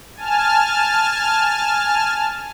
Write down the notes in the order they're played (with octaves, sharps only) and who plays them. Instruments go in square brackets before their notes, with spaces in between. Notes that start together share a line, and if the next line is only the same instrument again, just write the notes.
[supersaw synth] G#5 A5 F6